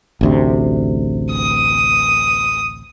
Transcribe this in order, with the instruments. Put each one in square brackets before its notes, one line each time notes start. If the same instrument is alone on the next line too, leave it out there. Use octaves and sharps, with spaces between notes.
[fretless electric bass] A1 D2 C3
[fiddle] D#6